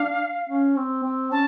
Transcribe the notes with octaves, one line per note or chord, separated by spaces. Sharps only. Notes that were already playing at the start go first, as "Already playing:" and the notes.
Already playing: D4 F5
C#4
C4
C4
C#4 A5